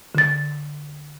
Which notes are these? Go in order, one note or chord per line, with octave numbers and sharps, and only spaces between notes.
D3 A6